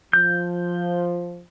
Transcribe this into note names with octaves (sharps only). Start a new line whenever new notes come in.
F3 G6